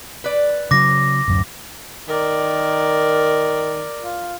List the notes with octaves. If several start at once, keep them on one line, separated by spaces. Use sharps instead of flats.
B4 D5
C#3 F#3 D6 A#6
D1 F#2
D#3 A#4 D5
F4